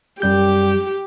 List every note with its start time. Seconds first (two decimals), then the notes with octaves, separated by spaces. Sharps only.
0.22 F#2 G3 G4 G6